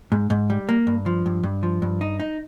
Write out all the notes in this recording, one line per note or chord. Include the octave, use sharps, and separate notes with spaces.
G#2
G#2
G3
A#3
G2
F3
G2
G2
F3
G2
D#4
D#4